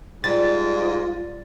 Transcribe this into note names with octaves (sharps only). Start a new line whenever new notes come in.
G#2 G3 F4 A6